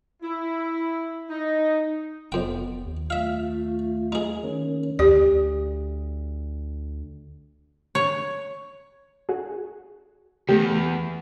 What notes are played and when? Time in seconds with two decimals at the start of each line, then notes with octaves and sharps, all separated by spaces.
0.22 E4
1.30 D#4
2.32 F1 F2 B3 G5
2.86 D#2
3.10 A3 F4 E5 F5
4.12 D#4 G#4
4.43 D#3 A#3 C#4
4.99 D2 G4 D5
7.95 C#5
9.29 F#4 G#4
10.49 E2 A3 G4